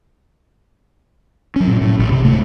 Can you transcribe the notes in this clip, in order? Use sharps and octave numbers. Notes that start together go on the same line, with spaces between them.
F#3 C#4
A#2
A2
A1
C3
D1 G#2 A3